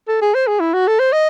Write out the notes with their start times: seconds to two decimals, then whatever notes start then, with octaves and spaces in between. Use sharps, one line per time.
0.08 A4
0.21 G#4
0.34 C5
0.47 G#4
0.60 E4
0.74 F#4
0.87 A4
0.99 C5
1.13 D#5